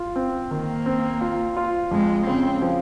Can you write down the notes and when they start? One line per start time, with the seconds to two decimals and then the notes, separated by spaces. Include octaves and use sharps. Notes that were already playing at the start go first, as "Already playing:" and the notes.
Already playing: F4
0.16 C4
0.51 D#3 A#3
0.86 C4
1.21 F4
1.57 F4
1.91 F2 G#3
2.27 C#3 C4
2.62 F3